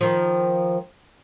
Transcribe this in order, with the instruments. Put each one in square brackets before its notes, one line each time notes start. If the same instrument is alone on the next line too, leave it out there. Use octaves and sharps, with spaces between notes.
[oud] D#3 F3